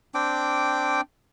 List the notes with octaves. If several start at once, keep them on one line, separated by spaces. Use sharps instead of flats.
C4 D4 G5 D6